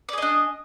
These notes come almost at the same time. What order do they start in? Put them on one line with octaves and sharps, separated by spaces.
D5 G#4 D#5 D4